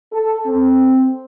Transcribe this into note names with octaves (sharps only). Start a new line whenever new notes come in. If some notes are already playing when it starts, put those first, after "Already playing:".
A4
C4